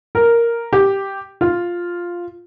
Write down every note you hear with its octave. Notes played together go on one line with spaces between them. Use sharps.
A#4
G4
F4